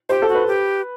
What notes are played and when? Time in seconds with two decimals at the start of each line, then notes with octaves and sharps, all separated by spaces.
0.09 G4 C5
0.22 A4
0.29 F#4
0.35 B4
0.47 G4